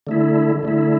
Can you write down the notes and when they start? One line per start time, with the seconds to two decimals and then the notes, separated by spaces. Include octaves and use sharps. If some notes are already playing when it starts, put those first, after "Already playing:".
0.07 D3 A3 E4
0.63 D3 A3 E4